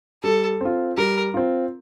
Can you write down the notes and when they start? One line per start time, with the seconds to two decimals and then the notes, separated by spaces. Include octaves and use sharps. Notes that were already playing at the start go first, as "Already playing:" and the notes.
0.23 G3 A4
0.61 C4 F4
0.97 G3 A#4
1.34 C4 F4